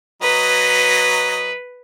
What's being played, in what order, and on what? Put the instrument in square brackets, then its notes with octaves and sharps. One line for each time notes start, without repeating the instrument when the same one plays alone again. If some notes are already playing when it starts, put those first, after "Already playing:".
[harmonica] F#3 D#5 A#5 [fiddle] B4